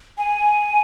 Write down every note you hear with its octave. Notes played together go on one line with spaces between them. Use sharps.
G#5